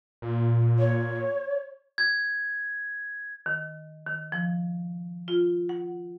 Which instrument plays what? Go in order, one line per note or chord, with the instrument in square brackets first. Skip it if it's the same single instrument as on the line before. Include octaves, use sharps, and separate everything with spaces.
[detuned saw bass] A#2
[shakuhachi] C#5
[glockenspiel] G#6
[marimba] D#3
D#3
F3
F4
F#5